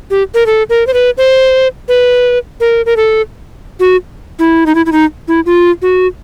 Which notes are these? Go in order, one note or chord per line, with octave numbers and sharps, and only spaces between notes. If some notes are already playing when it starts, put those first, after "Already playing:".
G4
A#4
A4
A#4
C5
B4
C5
B4
A#4
A#4
A4
F#4
E4
D#4
E4
E4
D#4
E4
F4
F#4